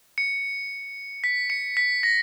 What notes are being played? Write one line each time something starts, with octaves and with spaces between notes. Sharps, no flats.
C#7
B6
C#7
B6
A#6